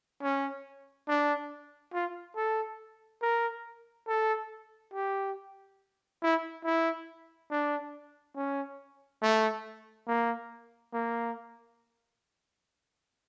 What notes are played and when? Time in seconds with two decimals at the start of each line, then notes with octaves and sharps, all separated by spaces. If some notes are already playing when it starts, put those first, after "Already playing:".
0.22 C#4
1.08 D4
1.93 F4
2.36 A4
3.22 A#4
4.08 A4
4.94 G4
6.22 E4
6.65 E4
7.51 D4
8.36 C#4
9.22 A3
10.07 A#3
10.93 A#3